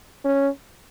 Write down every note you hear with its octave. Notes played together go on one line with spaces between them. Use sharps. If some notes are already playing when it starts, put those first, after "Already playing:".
C#4